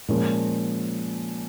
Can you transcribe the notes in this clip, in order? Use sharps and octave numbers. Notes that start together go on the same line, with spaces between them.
A#2 F3 G#3 C#4 A#4